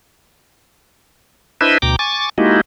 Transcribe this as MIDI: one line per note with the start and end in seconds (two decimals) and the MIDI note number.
1.61 1.78 62
1.61 1.78 64
1.61 1.78 71
1.61 1.78 72
1.61 1.78 75
1.61 1.78 76
1.82 1.96 38
1.82 1.96 47
1.82 1.96 79
1.82 1.96 82
1.82 1.96 86
1.99 2.29 80
1.99 2.29 85
1.99 2.29 86
1.99 2.29 93
2.38 2.61 56
2.38 2.61 58
2.38 2.61 63
2.38 2.61 64
2.38 2.61 66
2.38 2.61 67